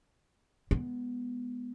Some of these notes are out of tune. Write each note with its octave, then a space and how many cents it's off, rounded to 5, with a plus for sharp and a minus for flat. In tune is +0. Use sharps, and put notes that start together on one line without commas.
G#3 +0 B3 +0